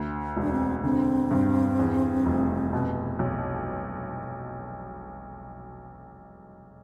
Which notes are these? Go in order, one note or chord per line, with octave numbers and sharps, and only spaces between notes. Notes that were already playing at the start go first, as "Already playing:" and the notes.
Already playing: D2
E1 D4
C4
D3 C4
G2
E2
F1
B2
B1